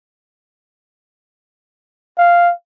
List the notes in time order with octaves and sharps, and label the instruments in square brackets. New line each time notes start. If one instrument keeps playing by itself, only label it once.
[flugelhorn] F5